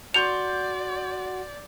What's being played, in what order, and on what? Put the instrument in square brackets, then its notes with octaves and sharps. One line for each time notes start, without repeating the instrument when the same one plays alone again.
[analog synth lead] F#4 [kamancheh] D5 [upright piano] C6 G6 C#7 [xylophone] F7